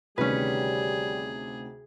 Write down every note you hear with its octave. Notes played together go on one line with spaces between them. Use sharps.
D2 C3 D#3 G3 C#4 G#4 B4